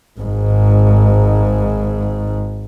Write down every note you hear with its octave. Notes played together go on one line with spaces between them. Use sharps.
G#1 G#2